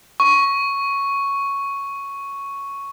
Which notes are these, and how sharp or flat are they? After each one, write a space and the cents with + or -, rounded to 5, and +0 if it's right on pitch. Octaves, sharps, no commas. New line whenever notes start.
C#6 +0